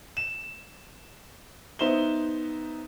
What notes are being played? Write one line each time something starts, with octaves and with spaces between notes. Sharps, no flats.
E7
B3 D#4 C5 E5 E7 G7